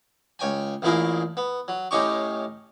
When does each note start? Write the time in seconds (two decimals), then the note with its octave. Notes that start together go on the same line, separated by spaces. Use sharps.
0.39 C#2 C#5 G5 G#5
0.82 A1 A#2 A3 E4 G#4 A#4
1.37 B3
1.68 F#3
1.91 A2 C#4 D#4 G4 C#6